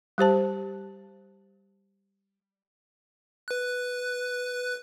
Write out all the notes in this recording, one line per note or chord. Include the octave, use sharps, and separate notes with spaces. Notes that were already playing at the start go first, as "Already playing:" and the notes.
G3 G4 C5 A5
B4 F#6